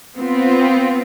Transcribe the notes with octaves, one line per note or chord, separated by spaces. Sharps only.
B3 C4 F4